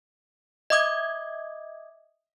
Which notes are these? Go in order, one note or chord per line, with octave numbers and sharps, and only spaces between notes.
D#5 E5 D6 D#6 G#6